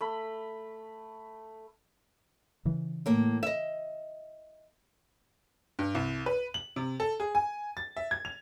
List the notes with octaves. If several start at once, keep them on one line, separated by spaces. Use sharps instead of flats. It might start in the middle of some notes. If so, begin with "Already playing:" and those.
A3 B5
C#3 E3
A2 A#3
D#5 E5
G2
C2
B4
F#7
C3
A4
G#4
G#5
A6
E5
G#6
F7